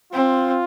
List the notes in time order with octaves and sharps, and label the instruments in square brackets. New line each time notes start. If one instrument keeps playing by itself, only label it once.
[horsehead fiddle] C4 [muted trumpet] F4